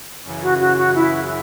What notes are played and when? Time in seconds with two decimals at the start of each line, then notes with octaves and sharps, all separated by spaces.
0.24 F#2 C#3 E3
0.42 F#4
0.60 F#4
0.77 F#4
0.95 E4